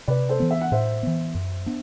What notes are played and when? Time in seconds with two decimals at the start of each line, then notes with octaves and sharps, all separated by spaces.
0.08 C3 B4 D5
0.29 A4 C5
0.40 E3 B3
0.51 E5
0.61 F#5
0.72 A2 C5 E5
1.03 E3 B3
1.35 F#2
1.66 B3 D4